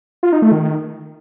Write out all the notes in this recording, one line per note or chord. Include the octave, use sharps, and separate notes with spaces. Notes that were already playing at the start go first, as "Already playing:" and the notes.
F4
D#4
A3
D#3